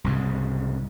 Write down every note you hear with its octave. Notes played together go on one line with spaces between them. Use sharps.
C2 G#2 C#3